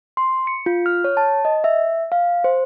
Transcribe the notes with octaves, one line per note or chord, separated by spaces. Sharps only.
C6
C#7
F4
F6
C#5
A5
D#5
E5
F5
C5